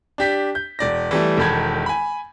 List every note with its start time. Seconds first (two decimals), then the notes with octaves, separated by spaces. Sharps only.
0.18 D4 G4 B6
0.55 G6
0.79 E1 D5 A#6
1.11 E3 G3 A3
1.37 E1 D#3 A4 B5 G#6
1.86 G#5 B5